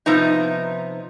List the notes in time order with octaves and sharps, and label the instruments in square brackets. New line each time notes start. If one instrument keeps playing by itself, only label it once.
[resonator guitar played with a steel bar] C3 F3 B3 D#4